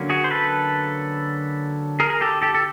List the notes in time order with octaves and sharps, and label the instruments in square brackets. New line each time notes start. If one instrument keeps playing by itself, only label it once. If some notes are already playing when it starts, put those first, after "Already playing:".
Already playing: [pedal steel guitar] D3 F#3 A#3 C#4
F#4 G#4
C5
A4 B4
G#4 A#4
A#4
G4 A4
G4 A4
A4